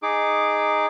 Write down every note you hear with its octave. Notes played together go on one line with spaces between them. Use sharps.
D#4 G#4 D6